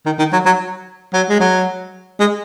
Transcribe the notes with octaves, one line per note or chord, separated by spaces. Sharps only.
D#3
D#3
F#3
F#3
F#3
G#3
F#3
G#3